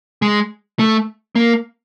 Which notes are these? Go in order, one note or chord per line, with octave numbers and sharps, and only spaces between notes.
G#3
A3
A#3